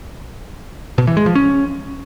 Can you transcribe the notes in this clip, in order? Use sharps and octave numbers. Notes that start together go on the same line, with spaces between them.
B2
E3
G#3
F3
C#4